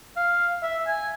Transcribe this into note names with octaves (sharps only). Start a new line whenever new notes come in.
F5
E5
G#5